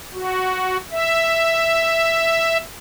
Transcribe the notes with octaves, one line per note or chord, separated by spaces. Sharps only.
F#4
E5